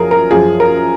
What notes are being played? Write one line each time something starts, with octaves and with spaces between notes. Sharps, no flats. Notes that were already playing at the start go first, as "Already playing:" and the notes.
Already playing: F#2 F3 G#4 A#4
A#4
F#2 F3 G#4
A#4